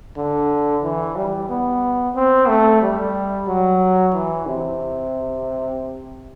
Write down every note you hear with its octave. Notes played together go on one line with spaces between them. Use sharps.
D3
E3
G3
B3
C4
A3
G3
F#3
E3
C3